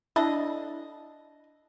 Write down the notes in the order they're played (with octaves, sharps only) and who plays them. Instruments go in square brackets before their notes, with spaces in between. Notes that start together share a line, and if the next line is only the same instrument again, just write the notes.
[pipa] D4 A4 D#5 [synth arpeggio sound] E4